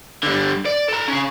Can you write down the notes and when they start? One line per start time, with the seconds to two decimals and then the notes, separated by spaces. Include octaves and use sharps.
0.23 D3 G3
0.66 D5
0.89 A4 A#5
1.09 C#4 G#4